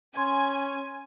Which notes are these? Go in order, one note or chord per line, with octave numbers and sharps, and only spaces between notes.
C#4 G#5 C6 G#6